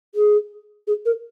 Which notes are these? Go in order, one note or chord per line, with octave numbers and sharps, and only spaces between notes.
G#4
G#4
A#4